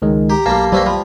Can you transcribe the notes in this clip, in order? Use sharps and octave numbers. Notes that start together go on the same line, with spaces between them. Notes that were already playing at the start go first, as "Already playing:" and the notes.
C#2 D#3 G#3
G4 A#5
B1 G3 A#3 F5 A5
E3 G3 A3 A#3 C5
F3 B5